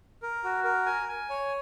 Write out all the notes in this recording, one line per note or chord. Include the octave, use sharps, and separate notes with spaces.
A#4
F#4
A#4
G#5
G#5
C#5